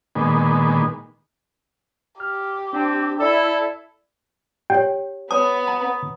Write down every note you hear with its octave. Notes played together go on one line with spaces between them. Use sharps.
A#2 D#3 G#3 B3
G4 F6
C4 D4 G5 A5
E4 A4 D5
G4 C#5 G5
B3 C#5 A5 D#6
A#5